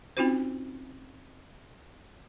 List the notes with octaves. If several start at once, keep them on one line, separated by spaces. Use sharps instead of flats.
C4 C#4 D#4 F4 F#4 C5